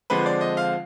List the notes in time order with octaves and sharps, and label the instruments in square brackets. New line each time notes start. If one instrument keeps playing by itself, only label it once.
[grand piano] D3 F3 G#3 C4 B4
D5
D#5
F5